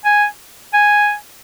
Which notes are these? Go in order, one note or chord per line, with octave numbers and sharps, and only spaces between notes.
G#5
G#5